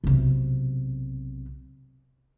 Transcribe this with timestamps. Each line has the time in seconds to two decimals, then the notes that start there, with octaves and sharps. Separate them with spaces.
0.04 B1 C3